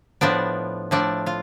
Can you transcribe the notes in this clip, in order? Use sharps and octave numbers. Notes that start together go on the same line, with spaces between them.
A2 F3 B3 D4 D5
A2 F3 A3 D4 D5
F4 F5